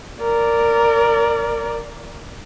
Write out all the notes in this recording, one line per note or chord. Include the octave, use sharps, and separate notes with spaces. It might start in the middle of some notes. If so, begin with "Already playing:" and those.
A#4 D5